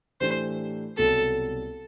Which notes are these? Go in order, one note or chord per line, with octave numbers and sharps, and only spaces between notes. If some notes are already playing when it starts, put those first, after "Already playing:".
A2 E3 A3 D4 G4 C5
C2 B2 F#3 A4